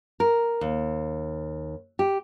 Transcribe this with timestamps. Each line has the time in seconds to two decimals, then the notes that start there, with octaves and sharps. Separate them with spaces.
0.20 A#4
0.61 D#2
1.99 G4